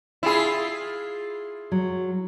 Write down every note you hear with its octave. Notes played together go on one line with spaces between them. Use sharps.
E4 F4 G#4
F#3